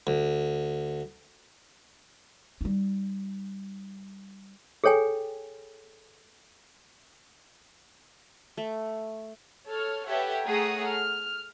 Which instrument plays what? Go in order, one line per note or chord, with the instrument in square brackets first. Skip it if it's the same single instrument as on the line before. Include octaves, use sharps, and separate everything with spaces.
[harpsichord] D2
[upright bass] G3 D#4
[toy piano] G#4 A4 C#5 G5 G#5
[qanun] A3
[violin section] A4 C#5 F6
G4 A4 B4 C#5 E5 F#5
A3 G#4 C#5 F#5 A#5 D#6
F6